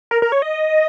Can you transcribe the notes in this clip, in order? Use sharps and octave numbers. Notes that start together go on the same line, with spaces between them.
A#4
A#4
C#5
D#5